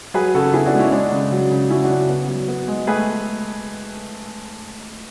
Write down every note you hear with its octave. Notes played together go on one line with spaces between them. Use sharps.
F#3 G#4 B4
C#3 F#4 A4
B3 E4 G#4
D4 F#4
G#3
C#4 E4
G#3 D4
C#3
F#3
C#3
F#3 C#4 E4
D4 F#4
C#3
B3
F#3
B3
G#3
A3 G#4 B4